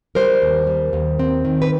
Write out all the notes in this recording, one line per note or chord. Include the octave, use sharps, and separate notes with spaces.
G3 A#4 C5
D#2
G3
D#2
C4
D#3
B4